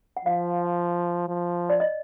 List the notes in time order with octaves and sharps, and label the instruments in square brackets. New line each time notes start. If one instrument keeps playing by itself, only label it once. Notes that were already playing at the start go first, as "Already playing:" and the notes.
[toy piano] F#5
[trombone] F3 [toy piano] F5
[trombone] F3
[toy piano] D5
D#5